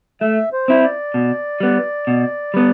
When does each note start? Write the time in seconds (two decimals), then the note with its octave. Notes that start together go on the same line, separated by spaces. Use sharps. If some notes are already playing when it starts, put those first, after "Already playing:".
0.21 A3 E5
0.53 C5
0.68 C4 E4
0.84 D5
1.14 B2
1.60 G3 B3
2.07 B2
2.54 G3 B3